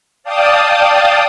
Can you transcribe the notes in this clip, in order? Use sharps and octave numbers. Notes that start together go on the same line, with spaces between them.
D5 F5 G5 A5 D#6